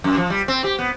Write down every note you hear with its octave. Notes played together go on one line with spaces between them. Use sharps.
F#2
F3
G3
C4
G4
B3